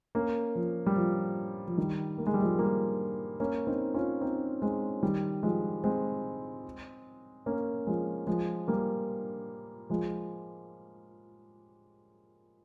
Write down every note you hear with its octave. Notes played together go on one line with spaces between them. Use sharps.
A#3 C#4
F3
G3
F3
F3
D#3 G3
A#3
G#3
G3
F3 G#3
G3 A#3
A#3 C#4
C4 D#4
C#4 F4
C4 D#4
G#3 C4
D#3 G3
F3 G#3
G#3 C4
A#3 C#4
F3 G#3
F3 G#3
G3 A#3
F3 G#3